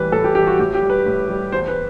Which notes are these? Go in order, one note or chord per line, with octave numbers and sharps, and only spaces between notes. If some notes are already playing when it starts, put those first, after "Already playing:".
Already playing: A2 E3 G3 B4
A2 A4
G4
E3 G3 G4
F#4
A2 G4
G4
G3
B4
A2
G3
E2 C5
B4